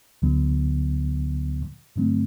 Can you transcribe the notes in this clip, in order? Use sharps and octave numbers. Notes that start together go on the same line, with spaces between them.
D2 D3 F#3 B3
G2 D3 F#3 A3 C4